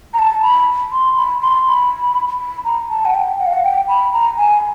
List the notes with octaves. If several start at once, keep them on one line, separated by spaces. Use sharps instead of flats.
A#5
A5
B5
C6
B5
C6
B5
B5
A#5
A5
F#5
G5
F#5
F5
F#5
G5
B5
A#5
G#5